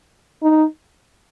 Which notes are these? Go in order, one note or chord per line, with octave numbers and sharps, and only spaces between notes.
D#4